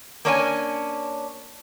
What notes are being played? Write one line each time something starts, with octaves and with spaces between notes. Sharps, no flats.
A#3 C#4 D4 C#5 D5 G#5